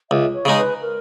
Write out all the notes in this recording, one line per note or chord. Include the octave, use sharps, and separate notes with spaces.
C#2 E5
C#5
C#3 G#3 D#4
B4
A#4